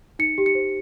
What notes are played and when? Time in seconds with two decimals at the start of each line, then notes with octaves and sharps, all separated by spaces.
0.19 D#4 C#7
0.38 G4
0.46 C#7
0.55 C5